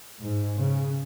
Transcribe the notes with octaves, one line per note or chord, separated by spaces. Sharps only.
G#2
C#3